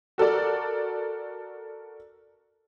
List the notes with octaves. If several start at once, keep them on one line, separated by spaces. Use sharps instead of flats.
F#4 A4 A#4 D5